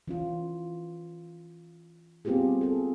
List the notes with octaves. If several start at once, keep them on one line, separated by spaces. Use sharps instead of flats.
E3 C#4 F4
G3 B3 C4 F4 G4 G#4
G#4 A4